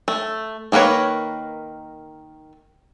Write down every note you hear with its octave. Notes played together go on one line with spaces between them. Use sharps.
A3
D#3 A#3 A#4 B4 C#5